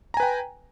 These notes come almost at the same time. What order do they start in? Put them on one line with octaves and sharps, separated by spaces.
A#5 G#5 B4 G5